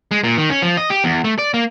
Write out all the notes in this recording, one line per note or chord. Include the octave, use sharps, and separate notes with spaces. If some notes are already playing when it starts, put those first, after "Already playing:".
G#3
A#2
D#3
C#4
F3
D#5
G4
E2
A3
D5
A#3